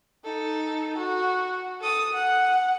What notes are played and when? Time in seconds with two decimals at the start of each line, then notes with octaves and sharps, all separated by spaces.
0.25 D#4 A4
0.97 F#4
1.81 A4 D#6
2.13 F#5